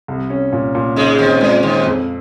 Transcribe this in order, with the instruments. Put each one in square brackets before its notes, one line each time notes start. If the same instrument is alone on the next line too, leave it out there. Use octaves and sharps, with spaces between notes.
[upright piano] C2
C#4
A#2
A#2
[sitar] G#2 G#3 [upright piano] C#3
[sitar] D#2 D#3 [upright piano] C4
[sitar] A#2 [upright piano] G#3
[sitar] D#2 D#3 [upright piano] C4
[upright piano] F2